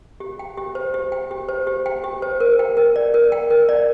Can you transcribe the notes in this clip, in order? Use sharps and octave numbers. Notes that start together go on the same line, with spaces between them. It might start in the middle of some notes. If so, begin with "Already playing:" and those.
G4
G5
G4
C5
G4
G5
G4
C5
G4
G5
G4
C5
A#4
G5
A#4
D5
A#4
G5
A#4
D5